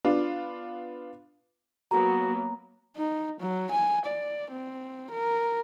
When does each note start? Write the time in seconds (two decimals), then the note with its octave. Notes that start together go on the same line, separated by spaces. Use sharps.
0.05 B3 D4 F4
1.91 F#3 A#3 B3 F#4 A#5
2.97 D#4
3.40 F#3
3.71 G#5
4.05 D5
4.51 C4
5.12 A#4